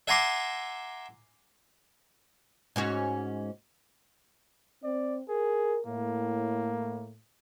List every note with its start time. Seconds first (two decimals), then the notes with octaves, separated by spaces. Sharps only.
0.08 E5 F#5 G#5 A#5 C6 D6
2.76 G#2 C#4 F#4
4.84 C4 D5
5.29 G#4 A#4
5.86 A2 A#3